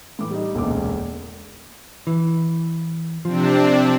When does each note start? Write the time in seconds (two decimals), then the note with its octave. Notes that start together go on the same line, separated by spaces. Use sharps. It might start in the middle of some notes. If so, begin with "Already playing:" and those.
0.19 A2 E3 D6
0.31 G3 D#4
0.55 E1 C#2 A#2 D3 A#4 D6
2.07 E3
3.25 C3 F3 C4 D4